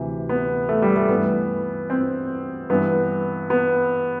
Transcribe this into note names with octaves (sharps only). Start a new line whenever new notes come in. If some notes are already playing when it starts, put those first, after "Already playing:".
Already playing: D2 C3 E3
B3
A3
G3
A3
G2 E3 B3
C4
G2 E3 B3
B3